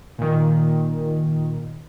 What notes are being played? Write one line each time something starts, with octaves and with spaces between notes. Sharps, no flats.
A#2 D#3